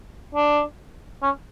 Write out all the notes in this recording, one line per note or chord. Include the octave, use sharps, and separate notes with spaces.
D4
C#4